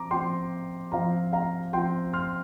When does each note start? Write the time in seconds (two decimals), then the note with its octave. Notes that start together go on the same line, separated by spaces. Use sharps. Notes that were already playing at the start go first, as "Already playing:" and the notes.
Already playing: F3 C4 F4 A#5 D6
0.11 F3 C4 F4 G5 C6
0.92 F3 C4 F4 F5 A#5
1.32 F5 A#5
1.73 F3 C4 F4 G5 C6
2.13 C6 F6